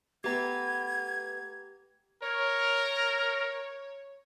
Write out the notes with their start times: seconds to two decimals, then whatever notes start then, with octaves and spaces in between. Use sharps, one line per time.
0.24 A3 B3 G4 A#5 G#6
2.23 A#4 C#5